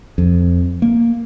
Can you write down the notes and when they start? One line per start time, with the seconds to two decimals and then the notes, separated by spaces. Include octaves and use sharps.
0.18 F2
0.82 A#3